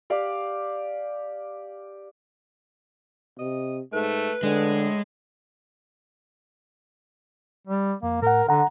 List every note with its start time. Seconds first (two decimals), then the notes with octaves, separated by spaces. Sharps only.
0.10 G4 D5 F5
3.39 C3 D#5
3.93 G#2 A3 B4
4.43 A2 D3 G#3
7.67 G3
8.03 F2 A#3
8.22 A2 A#4 F#5
8.49 D3 F#5 A#5